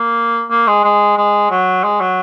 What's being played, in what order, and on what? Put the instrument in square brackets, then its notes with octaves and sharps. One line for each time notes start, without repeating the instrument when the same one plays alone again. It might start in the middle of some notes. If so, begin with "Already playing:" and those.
Already playing: [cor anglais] A#3
A#3
G#3
G#3
G#3
F#3
G#3
F#3